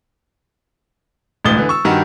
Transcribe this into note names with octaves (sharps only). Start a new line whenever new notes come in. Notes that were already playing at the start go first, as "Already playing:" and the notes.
E1 A1 D2 D#6 A6 G7
D3 E3 G#5
C#6 E6
G2 D#3 F#4 G4 A#5